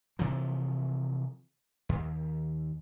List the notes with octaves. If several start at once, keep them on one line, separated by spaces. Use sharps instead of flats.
C3 E3 F3
D#2